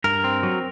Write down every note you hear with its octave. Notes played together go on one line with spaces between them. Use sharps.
G2 A#4
C4
F#3